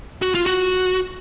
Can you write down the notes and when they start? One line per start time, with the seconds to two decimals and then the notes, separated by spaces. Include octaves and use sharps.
0.22 F#4
0.35 F4
0.46 F#4